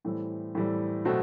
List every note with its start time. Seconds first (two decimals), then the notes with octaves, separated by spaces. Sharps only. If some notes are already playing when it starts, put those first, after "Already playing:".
0.05 A2 E3 G3 C4
0.55 A2 E3 G3 C4
1.05 B2 F#3 A3 C4 F#4